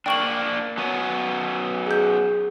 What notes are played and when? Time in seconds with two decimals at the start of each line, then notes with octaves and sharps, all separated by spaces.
0.06 A#3 D4 G5 C#6 F#7
0.78 F#3 B3 C#4
1.87 G#4 G6